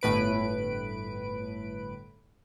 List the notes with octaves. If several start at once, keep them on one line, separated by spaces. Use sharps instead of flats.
G1 A2 B4 D7